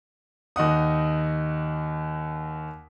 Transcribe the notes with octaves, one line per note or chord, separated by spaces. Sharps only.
D#2 D#4 F#5 D#6